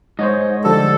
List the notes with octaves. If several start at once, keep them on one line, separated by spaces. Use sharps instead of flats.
G#2 C5 C#5 D#5
D3 F3 G3 A4